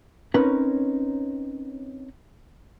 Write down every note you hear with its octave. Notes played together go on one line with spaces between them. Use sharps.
C4 C#4 D#4 A#4 B4 C#5